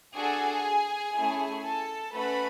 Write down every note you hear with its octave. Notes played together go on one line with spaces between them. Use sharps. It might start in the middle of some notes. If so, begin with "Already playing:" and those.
D4 F#4 G#4 A4 G#5
A3 C#4 E4 G#4
A4 A5
A3 C#4 F#4 A4 B4 B5